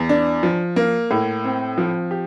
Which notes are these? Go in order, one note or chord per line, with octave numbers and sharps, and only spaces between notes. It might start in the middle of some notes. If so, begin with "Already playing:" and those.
Already playing: E2
D4
F3
A#3
A2
C4
F3
G4